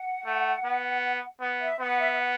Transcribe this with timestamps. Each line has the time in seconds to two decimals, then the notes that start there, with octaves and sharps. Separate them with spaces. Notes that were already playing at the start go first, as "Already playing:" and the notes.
Already playing: F#5
0.25 A3
0.65 B3
1.41 B3
1.61 E5
1.80 B3 F#5
1.99 E5
2.12 E5
2.19 F#5